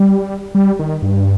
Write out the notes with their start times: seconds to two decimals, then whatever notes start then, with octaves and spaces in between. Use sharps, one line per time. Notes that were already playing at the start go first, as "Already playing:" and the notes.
Already playing: G3
0.55 G3
0.79 D#3
1.02 G2